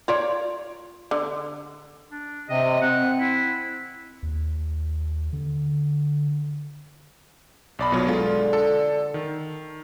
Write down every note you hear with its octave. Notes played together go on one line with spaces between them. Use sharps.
F4 C#5 D5
D3
D4
C3 D#5
C4 F#5
E4
D#2
D3
B1 D5 B5
B2 F#3 F4
D3 G#3 F4
A4
D#3